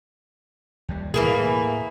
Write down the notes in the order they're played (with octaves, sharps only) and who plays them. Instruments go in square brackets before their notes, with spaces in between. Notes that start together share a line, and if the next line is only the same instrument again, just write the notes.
[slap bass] D#2 G3
[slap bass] A2 A3 [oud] E3 A#3 G#4